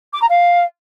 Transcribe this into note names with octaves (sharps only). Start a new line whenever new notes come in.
D6
A#5
F5